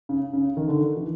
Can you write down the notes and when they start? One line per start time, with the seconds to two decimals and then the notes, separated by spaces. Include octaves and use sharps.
0.09 C#3
0.33 C#3
0.57 D#3
0.68 D3
0.97 E3